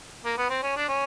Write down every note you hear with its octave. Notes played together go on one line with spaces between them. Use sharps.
A#3
B3
C4
C#4
D4
C#4